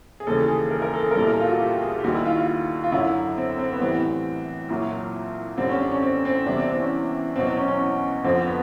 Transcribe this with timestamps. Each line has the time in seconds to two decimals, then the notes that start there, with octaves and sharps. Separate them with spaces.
0.20 G#4
0.27 D#2 C#3 E3 G3 A4
0.48 G#4
0.71 A#4
0.82 A#4
0.94 A4
1.04 G#4
1.11 A#4
1.15 C2 A#2 G3 A4
1.27 A#4
1.40 F4
1.49 F#4
1.59 G4
1.82 G#4
1.99 G4
2.04 D#2 D#3 G3 F#4
2.15 E4
2.26 F4
2.36 F4
2.84 F4
2.92 F#2 D3 F#3 E4
3.37 C4
3.59 C4
3.73 B3
3.81 A2 E3 G3 C4
4.69 C2 A#2 F#3
5.58 F#2 D3 G3 C4
5.69 C#4
5.80 D4
5.91 C#4
6.02 C4
6.25 C4
6.46 E2 C3 E3 G3 D4
6.57 C4
6.69 C4
6.80 C#4
7.36 E2 B2 F#3 C4
7.46 C4
7.57 C#4
7.68 C#4
8.24 F2 D3 F3 C4
8.47 B3